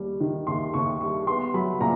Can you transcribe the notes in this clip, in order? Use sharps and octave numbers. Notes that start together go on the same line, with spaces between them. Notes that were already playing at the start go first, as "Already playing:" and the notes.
Already playing: D#2 G3
D#3
D#2 C6
D#2 C#6
G3 C#6
B3 C6
F#3 B5
A#2 A#5